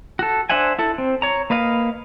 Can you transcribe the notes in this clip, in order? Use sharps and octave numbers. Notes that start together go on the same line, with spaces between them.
F#4 A4
D4 C5 E5 F#5 G#5
E4 A4
C4
C#5 A#5
A#3 B4 D#5 F5